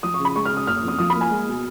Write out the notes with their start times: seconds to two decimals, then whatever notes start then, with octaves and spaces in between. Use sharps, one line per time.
0.03 F3 D#6
0.14 C#6
0.19 C#3
0.25 B5
0.36 G#3 C#6
0.45 F6
0.52 C#3 D#6
0.67 F#1 F6
0.77 D#6
0.83 F2
0.88 D#6
0.99 F3 D#6
1.10 B5
1.15 A#3
1.21 G#5
1.31 G#3
1.48 B2